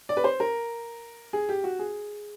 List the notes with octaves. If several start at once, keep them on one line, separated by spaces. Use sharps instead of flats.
D5
B4
C5
A#4
G#4
G4
F#4
G#4